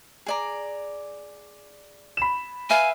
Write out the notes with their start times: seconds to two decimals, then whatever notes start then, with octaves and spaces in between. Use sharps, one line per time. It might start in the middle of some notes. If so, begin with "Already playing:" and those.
0.26 G#4 D5 A#5
2.17 B5 E7
2.70 B4 E5 F5 G#5